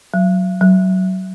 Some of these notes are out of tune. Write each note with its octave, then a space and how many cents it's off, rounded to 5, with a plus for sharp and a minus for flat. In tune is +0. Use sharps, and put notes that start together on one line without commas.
F#3 +0
F#3 +20